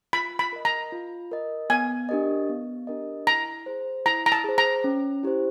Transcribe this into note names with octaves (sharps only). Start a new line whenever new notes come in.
F4 B5
B5
A#4 D#5
A#5
F4
A#4 D#5
B3 G#5
D4 G4 A#4 D#5
B3
D4 G4 A#4 D#5
E4 A#5
G#4 C5
E4 A#5
A#5
A5
G#4 C5
A#5
C#4
E4 G4 C5